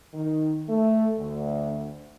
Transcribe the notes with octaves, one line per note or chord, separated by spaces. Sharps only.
D#3
A3
D2